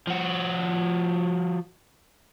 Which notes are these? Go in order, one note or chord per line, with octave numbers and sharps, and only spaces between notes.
F3 F#4